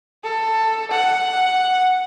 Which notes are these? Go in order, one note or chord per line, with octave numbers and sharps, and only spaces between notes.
A4
F#5